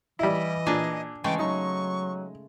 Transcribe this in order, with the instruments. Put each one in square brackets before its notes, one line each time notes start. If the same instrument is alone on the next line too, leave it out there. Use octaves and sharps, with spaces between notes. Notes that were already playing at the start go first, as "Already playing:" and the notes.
[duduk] E3 [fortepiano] G3 E4 [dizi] D#5
[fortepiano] A#2 [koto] D4 G#4
[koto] C#3 G#3 A3 [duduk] E3 [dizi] G5
[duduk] F#3 [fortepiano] D#4 [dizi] C#6